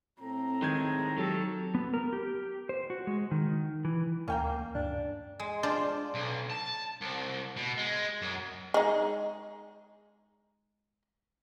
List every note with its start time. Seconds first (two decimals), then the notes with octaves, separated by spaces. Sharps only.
0.20 A2 C4 A4 A#5
0.62 D#3 G#3 G6 G#6
1.18 F#3 G4 A4
1.75 B3
1.94 A#4
2.13 G4
2.69 C5
2.90 F#4
3.07 G#3
3.31 D#3
3.85 E3
4.28 D2 A#3 C#4 G5 A#5
4.75 G2 D4
5.40 G#3
5.63 D4 F4 C5 D5
6.14 B1
6.50 A5
7.01 C2
7.57 B2
7.77 G#3
8.22 F#2
8.74 G#3 D#4